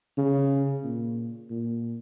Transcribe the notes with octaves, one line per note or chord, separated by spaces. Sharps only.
C#3
A#2
A#2